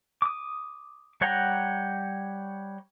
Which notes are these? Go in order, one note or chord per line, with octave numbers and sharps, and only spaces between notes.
D6 D#6
G3 C#5 F#5 G5 A#5